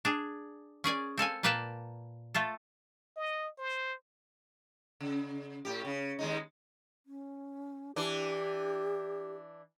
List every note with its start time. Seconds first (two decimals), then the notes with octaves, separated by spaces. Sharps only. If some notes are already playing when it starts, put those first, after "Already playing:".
0.05 D4 G#4
0.84 C#4 G#4 D5 G#5
1.18 C4 A4 F5 G#5
1.43 A#2 A#3 B4 F5 G5 A5
2.34 A3 F4 A4
3.16 D#5
3.58 C5
5.00 C#3
5.65 A2 G4
5.85 C#3
6.19 D#2 G#3 D#4
7.06 C#4
7.96 E3 D4 G4